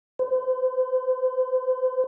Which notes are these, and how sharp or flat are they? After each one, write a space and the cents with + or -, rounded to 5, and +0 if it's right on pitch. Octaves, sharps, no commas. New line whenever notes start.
C5 -35